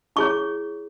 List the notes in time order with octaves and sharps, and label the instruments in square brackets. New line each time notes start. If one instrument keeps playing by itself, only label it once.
[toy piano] E4 G#4 C#5 C#6